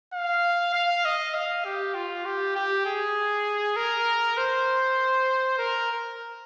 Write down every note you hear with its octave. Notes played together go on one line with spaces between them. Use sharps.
F5
F5
D#5
F5
G4
F4
G4
G4
G#4
A#4
C5
A#4